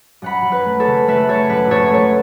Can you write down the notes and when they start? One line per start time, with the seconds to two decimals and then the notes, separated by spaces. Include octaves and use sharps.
0.22 F#2 F#5 B5
0.45 F#2
0.52 B4
0.66 A3
0.80 A4 C#5
0.87 C#3
1.08 A3 B4 E5
1.28 A3 A4 C#5
1.50 F#2 B4
1.70 F#2 A4 C#5
1.90 A3 A4 C#5